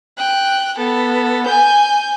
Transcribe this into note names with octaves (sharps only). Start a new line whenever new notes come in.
G5 F#6
B3 A4
G#5 G6